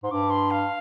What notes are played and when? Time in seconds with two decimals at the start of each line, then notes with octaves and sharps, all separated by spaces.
0.03 G#2 C6
0.11 G2 D6
0.30 C6
0.51 F5